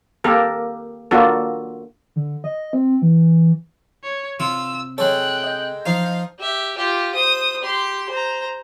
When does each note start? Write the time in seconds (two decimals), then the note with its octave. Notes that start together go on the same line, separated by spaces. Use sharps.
0.24 A#3 G4 A4 A#4
1.11 A#3 D4 F4 F#4 A4
2.16 D3
2.44 D#5
2.73 C4
3.02 E3
4.03 C#5
4.40 C3 F4 E6
4.98 G#3 A4 C#5 G5 F#6
5.44 D#5 G6
5.86 F3 D#4 F5
6.40 G4 E5
6.78 F4 G4
7.15 C5 D#6
7.62 G4 C6
8.10 C5 A#5